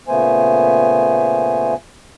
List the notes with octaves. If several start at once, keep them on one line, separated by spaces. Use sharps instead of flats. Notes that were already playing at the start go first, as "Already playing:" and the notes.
A#2 C#3 A3 B3 C5 G#5